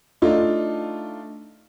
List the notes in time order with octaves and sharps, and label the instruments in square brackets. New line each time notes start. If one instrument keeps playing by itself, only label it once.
[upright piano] A3 D4 D#4 F4